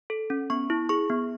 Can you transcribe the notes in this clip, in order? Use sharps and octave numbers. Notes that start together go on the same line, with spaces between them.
A4
C#4
B3 C#6
E4
G#4 C#6
B3